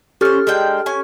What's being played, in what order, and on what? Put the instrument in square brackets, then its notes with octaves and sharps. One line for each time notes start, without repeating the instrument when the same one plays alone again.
[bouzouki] C#4 C5 [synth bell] G4 A4 F6
[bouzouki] G#3 D4 G5
C#4 G#5